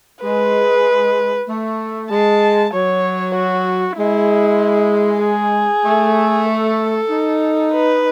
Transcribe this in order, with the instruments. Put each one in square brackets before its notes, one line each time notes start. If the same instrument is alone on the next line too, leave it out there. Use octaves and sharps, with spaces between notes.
[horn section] G#3 [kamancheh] B4
[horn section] A3
[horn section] G#3 [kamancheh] A5
[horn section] F#3 [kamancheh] C#5
[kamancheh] F#4
[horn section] G#3 [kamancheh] E4
[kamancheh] G#4
[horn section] A3
[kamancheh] A4
[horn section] D#4
[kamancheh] B4